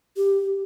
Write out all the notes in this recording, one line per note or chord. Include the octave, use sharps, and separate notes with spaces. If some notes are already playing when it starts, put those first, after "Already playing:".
G4